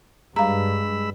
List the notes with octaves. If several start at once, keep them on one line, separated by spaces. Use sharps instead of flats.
G2 G#3 F5 A#5 B5 E6